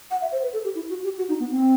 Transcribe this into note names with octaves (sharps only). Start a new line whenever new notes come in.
F#5
E5
C5
B4
A4
G4
E4
F#4
G4
F#4
D#4
B3
C4